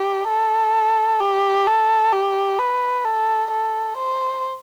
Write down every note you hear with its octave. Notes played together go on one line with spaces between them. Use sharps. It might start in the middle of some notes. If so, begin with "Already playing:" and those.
Already playing: G4
A4
G4
A4
G4
B4
A4
A4
C5